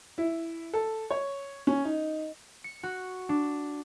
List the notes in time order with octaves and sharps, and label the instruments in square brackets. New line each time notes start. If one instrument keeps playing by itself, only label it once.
[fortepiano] E4
A4
C#5
C#4
D#4
[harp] C#7
F#4
D4